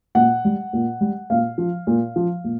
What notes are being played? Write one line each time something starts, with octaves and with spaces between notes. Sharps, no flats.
A#2 F#5
G3
A#2
G3
A#2 F5
F3
A#2
F3
A#2